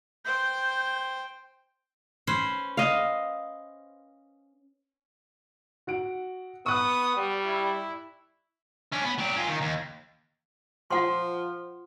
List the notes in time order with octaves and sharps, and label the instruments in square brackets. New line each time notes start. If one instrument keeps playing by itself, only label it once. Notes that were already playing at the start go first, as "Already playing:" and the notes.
[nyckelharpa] C5 G5 [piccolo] G6
[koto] C#4 B4 C5
[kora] D#5 F5
[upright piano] F#4 F#5 D7
[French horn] B3 [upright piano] C#6 F#6 [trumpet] D#6
[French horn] G3
[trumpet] E4
[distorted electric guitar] C#4 D4
B3
F#3 G4
C#4 F4
D#3
D#2
[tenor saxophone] F3 [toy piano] F4 F#5 C6